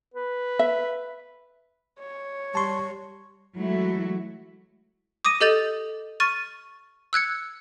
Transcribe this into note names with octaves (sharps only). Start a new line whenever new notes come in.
B4
E5
C#5
G3 A5 C6 C#6
E3 F#3 G#3 A3 E4 F#4
D6 D#6 A#6 D#7
G4 A4 D#5 G6 A6 F7
C#6 F6 A6 D#7
E6 F#6 G#6 C#7